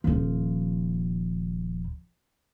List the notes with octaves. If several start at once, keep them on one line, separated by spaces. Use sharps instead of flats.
D#1 F3